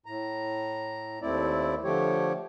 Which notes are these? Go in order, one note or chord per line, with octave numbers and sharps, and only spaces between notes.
A2 A#5
D#2 A3 C4 E4 D5
D3 F3 A3 G4 C#5